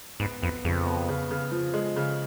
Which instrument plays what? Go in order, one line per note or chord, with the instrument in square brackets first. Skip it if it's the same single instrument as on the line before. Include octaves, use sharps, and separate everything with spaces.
[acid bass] G#2 [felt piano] B3
[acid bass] F2 [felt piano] B3
[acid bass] F2 [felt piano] C#3
[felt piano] B3
C#3
C#3
F3
G#3
C#3